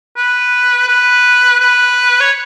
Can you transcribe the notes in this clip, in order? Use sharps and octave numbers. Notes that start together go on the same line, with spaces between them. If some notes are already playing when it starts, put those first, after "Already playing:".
B4
B4
B4
C#5